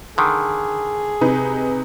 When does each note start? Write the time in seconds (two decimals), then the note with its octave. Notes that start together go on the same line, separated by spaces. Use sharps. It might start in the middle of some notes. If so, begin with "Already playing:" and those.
0.18 D3 D#3 G#4
1.21 C3 D#4 B4